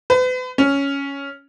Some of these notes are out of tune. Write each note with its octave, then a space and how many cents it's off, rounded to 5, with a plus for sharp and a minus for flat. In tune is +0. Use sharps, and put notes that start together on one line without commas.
B4 +40
C#4 +5